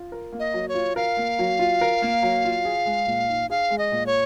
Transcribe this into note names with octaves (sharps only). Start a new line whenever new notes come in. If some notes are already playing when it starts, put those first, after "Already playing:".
Already playing: F4
A#4
A#3
D#5
F#3
C#5
F4
A#4 F5
A#3
F#3
F4
A#4
A#3
F#3
F4
G#4
G#3
A#2
D#4
G#4 F5
G#3
D#5
A#2
C#5